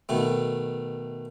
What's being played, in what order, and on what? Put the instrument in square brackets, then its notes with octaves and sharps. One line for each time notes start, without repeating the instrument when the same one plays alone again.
[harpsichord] B2 D#3 A3